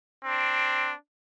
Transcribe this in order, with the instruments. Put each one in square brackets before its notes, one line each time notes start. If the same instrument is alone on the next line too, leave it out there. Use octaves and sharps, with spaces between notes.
[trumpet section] C4 D4